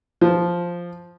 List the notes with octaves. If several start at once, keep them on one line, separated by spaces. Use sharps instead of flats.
F3